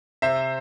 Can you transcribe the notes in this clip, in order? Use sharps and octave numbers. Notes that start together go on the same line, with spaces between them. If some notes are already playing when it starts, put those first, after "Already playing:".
C3 C5 E5